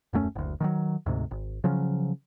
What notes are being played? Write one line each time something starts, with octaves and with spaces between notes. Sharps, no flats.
D#1 F#2 A3 C#4
F#1 D2
D#3 F3 F#3
D2 G#2 C3
G#1
C#3 F3 F#3 C#4